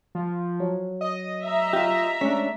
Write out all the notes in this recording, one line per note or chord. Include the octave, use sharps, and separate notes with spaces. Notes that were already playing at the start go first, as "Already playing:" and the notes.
F3
F#3
D#5
E5 A#5
F4 G4
G#3 A3 C#4 D4 B6